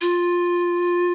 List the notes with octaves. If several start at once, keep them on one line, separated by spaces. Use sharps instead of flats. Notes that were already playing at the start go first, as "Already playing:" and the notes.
F4